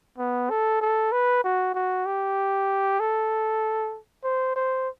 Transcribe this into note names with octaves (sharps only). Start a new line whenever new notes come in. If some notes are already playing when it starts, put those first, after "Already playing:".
B3
A4
A4
B4
F#4
F#4
G4
A4
C5
C5